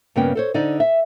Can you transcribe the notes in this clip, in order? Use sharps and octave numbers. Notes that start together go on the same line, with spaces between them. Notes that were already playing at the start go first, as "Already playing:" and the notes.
G2 C#3 A#3 B3 G5
A4 C5 C#5
D3 D#4 C5 D5
E5